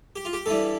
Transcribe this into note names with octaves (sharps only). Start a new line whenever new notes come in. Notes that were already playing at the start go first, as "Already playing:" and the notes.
G4
F4
G4
G2 E3 G3 A4